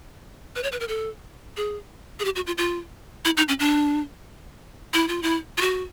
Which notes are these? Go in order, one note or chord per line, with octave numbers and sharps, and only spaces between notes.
B4
C#5
B4
A#4
A4
G#4
G#4
G4
F#4
F4
F4
E4
D#4
C#4
D4
E4
F4
E4
F4
F#4